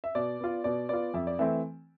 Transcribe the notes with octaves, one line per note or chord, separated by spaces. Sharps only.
E5
B2 D5
B3 F4
B2 D5
B3 F4 D5
F2 E5
D5
E3 A3 C4 E5